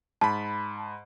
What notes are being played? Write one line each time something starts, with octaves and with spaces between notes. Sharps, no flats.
G#2 A5 B5